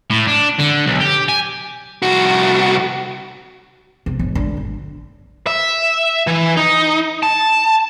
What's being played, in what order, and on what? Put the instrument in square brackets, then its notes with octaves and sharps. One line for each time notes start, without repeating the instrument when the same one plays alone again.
[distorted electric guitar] A2
D4
D3
B1
G4
G#5
[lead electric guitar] C2 F#4
[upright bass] C3
A1 B2
D3
G#1
[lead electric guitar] E5
E3
D#4
A5